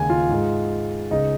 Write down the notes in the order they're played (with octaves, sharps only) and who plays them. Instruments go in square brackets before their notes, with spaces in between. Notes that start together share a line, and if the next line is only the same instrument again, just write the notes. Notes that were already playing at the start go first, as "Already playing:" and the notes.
Already playing: [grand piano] D#2 C#3 G#3 G#5
F4
G#2 G#3
C#2 C#3 G#3 D#4